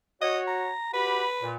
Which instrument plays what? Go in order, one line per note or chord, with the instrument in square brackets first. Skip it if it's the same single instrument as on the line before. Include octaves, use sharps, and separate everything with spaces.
[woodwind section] F#4 C#5 [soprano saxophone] D#5
[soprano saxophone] A#5
[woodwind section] F#4 G4 B5 [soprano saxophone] B4
[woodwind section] A#2